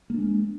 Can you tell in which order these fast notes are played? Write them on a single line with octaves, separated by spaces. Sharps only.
A#3 D4 G#3